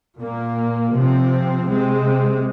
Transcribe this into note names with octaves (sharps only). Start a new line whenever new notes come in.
A#2 A#3
C3 F3 C4
C3 G#3 C4